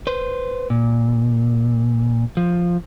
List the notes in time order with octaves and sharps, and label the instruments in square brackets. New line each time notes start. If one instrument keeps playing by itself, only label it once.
[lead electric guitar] B4 C5
A#2
F3